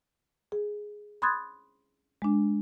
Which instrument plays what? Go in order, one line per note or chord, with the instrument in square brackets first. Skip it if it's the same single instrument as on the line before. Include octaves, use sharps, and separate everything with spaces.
[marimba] G#4
B5 C6 D#6 F#6 G#6 A6
G#3 D4